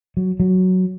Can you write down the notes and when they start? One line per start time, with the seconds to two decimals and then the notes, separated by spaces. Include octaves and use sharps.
0.17 F#3
0.40 F#3